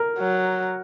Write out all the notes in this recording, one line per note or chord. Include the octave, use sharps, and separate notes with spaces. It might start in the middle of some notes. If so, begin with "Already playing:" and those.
Already playing: A#4
F#3